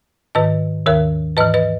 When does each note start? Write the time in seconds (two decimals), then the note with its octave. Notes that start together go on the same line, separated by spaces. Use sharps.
0.35 G#2 D#3 B4 D#5
0.86 D#2 D#3 A#4 C#5
1.37 G#2 E3 B4 D#5
1.54 B4 D#5